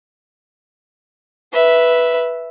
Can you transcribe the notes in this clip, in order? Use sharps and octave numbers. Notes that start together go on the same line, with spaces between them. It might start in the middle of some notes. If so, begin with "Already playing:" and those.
B4 E5